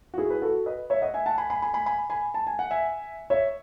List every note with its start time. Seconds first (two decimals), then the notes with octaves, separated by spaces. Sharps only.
0.14 F#4
0.18 E4 G#4
0.30 B4
0.42 F#4 A4
0.66 B4 D#5
0.90 C#5 E5
1.02 D#5 F#5
1.14 E5 G#5
1.26 F#5 A5
1.38 G#5 B5
1.50 G#5 B5
1.62 G#5 B5
1.74 G#5 B5
1.86 G#5 B5
2.10 G#5 B5
2.34 A5
2.47 G#5
2.59 F#5
2.71 E5 G#5
3.30 C#5 E5